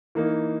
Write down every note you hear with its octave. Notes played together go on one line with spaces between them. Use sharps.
E3 A#3 D#4